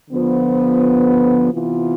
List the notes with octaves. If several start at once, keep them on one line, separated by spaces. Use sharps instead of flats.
D3 F3 B3 F4 C5
C3 E3 B3 F4